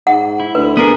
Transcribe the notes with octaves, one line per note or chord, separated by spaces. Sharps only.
G#2 F#5
E4
D2 B4
B3 D4 G#4 A#4 D#7